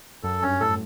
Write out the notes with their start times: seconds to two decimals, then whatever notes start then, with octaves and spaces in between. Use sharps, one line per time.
0.23 F#2 A4
0.42 G2 C#4
0.60 A2 A4